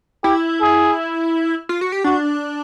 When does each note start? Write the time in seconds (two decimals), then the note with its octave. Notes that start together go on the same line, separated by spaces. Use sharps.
0.23 E4 G4
0.60 G#4
1.69 F4
1.81 F#4
1.92 G4
2.04 D4 F#4